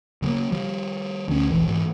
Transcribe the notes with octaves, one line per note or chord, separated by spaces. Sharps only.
C#3 F#3 G#3 A#3
F3 G3
D2 C#4
E1 A#1 E3
G#2 E3